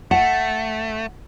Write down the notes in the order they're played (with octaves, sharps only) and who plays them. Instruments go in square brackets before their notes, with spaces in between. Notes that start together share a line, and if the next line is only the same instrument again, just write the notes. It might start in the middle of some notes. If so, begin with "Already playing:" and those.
[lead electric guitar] A3 [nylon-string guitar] F#5